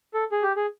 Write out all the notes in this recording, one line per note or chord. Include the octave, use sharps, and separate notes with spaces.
A4
G#4
G4
G#4